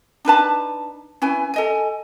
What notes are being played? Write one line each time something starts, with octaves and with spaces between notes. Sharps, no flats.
D4 D#4 B4 A5
C#4 E4 B4 G#5
A4 D#5 G#5